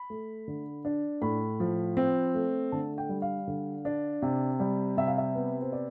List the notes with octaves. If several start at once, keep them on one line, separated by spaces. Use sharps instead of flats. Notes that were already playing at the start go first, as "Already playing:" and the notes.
Already playing: B5
A3
D3
D4
A2 B5
F3
C4
A3
D3 A5
G5
G3
F5
D3
D4
C3
G3
C3 E5
F5
E5
B3
C5
D5